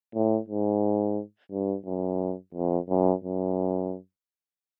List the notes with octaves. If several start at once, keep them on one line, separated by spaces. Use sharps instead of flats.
A2
G#2
G2
F#2
F2
F#2
F#2